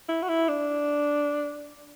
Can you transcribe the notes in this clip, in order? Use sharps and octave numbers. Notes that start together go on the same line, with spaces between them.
E4
F#4
E4
D4